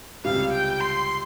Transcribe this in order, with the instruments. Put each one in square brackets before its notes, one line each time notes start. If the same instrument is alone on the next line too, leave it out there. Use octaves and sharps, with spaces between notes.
[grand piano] C#2 C3 G3 [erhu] F5
[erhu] G5
C6